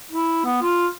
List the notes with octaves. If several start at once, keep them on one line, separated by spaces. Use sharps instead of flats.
E4
B3
F4